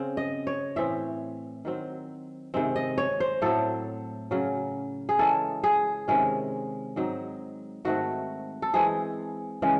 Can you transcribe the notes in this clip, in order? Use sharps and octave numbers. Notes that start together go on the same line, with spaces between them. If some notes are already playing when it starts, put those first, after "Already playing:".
Already playing: C#3 C4
D#5
C#5
A2 E3 C4 E5
D#3 F#3 C4
C3 D#3 G#3 C4
D#5
C#5
C5
A2 F#3 C4 A4
C#3 F#3 C#4
G#4
E3 G#3 C#4 A4
G#4
C3 D#3 G#3 C#4
G#2 F#3 C4 D#4
G#2 D#3 A3 C4 F#4
A4
E3 G#3 C4 E4 G#4
C#3 E3 G#3